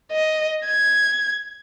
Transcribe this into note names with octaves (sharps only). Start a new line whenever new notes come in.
D#5
G#6